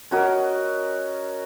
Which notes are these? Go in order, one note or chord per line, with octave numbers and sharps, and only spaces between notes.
C#4 F#4 A#4 D#5